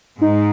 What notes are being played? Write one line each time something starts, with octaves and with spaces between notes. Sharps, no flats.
G#2 D#4